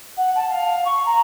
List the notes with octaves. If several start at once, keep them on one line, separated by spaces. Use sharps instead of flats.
F#5
A5
F5
C#6
A#5